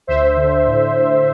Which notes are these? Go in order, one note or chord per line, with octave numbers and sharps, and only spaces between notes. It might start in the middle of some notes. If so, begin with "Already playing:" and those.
D2 C5 E5
D3
A2